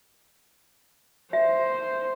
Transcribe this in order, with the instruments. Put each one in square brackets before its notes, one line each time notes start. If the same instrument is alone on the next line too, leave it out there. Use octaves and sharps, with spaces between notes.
[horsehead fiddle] C5 [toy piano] E5